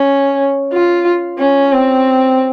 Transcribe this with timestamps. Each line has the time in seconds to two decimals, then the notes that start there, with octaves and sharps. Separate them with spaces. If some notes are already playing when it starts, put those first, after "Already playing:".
Already playing: C#4
0.73 F4
1.39 C#4
1.73 C4